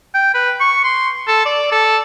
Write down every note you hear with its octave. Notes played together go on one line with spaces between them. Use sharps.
G5
B4
C#6
C6
A4
D5
A4